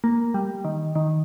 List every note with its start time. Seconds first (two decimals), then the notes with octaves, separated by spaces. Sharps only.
0.04 A#3
0.34 G3
0.65 D#3
0.95 D#3